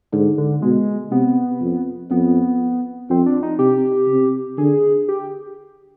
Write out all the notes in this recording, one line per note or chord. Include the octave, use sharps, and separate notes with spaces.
G#2 D3
D3
B2 G#3
C3 B3
F2
F2 B3
F2 C4
D4
D#4
C3 G4
C3
D3 G#4
G4